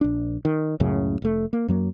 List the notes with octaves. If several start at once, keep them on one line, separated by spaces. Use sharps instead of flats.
A#1 D4
D#3
C#2 F#2 A2 C#3
F1 A3
A#3
F#2 F#3 A#3